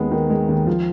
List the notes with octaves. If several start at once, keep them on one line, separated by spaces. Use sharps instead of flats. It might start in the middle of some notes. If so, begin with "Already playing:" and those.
Already playing: D#2 G#3 B3
D#3
G#3
D#2
F3